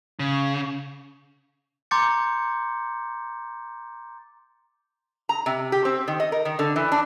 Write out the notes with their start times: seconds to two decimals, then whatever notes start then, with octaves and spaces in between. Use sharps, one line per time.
0.19 C#3
1.91 A#5 C6 D6 G6 A6 C#7
5.29 A#5
5.46 C3
5.72 G4
5.85 C4
6.08 D#3
6.20 D#5
6.32 A#4
6.45 D#3
6.59 D3
6.76 E3
6.92 D4